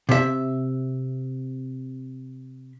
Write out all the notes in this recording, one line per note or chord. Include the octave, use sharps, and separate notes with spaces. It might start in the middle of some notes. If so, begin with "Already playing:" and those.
C3 E5